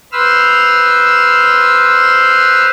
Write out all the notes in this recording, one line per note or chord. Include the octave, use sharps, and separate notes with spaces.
B4 C5 E6 F6